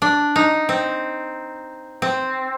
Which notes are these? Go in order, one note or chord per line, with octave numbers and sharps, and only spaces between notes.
D4
D#4
C4
C4